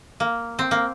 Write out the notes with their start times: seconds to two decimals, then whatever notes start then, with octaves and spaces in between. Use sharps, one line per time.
0.20 A#3
0.59 C4
0.71 A#3